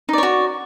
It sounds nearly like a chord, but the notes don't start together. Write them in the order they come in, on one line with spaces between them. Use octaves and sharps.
D#4 D5 C#5 F#4